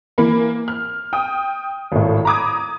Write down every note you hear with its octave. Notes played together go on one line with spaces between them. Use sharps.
E3 A#3 B5
F6
G5 D#6
G#1 A2
A#5 B5 D6 D#6 G#6